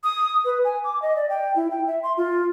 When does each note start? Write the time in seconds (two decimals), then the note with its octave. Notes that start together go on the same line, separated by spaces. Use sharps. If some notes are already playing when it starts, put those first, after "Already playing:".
0.04 D#6
0.45 B4
0.64 G#5
0.84 D6
1.02 D#5
1.16 D5
1.29 G5
1.56 E4
1.71 G5
1.87 E5
2.03 C6
2.17 F4